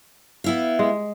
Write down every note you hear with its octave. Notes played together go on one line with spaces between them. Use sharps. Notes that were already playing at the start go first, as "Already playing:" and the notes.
B3 E4 F5
G#3